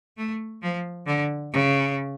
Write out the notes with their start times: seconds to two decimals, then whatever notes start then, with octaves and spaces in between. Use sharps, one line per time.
0.17 A3
0.62 F3
1.06 D3
1.53 C#3